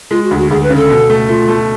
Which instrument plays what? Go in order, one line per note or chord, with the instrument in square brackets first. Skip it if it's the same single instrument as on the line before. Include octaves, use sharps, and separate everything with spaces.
[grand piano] G#3 [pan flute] F4
[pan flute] F#4
[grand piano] D2
[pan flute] F#4
[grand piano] D2 [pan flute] G#4
[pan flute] B4
[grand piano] C#3
[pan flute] A4
[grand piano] B2
A3
[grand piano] A3 [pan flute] F4
[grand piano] A3